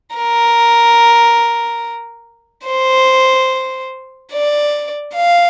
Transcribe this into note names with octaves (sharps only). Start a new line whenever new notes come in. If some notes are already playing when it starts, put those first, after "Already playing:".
A#4
C5
D5
F5